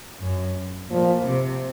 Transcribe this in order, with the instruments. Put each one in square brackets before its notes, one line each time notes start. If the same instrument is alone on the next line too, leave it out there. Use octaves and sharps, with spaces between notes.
[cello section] F#2
[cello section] A#2 [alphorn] F3
[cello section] C3